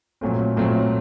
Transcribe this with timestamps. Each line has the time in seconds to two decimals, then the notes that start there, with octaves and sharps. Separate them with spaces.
0.21 A#2 F#3 A3 C4
0.56 A#2 F#3 A3 C4